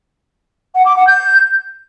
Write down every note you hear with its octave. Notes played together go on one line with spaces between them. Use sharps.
F#5
D6
F#5
G6